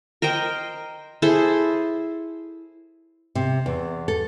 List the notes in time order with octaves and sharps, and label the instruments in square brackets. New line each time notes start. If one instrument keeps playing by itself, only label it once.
[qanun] A#4 C5 D#5 G5
E4 G#4 A4 C5
[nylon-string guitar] C3
E2
A4